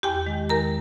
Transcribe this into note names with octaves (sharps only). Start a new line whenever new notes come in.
E2 G4 G5
D#3 G#3
E2 A#4 A#5